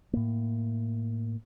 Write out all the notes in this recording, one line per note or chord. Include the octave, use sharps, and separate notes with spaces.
A2 A#3